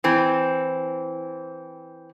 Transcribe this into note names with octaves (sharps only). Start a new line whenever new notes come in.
E3 C4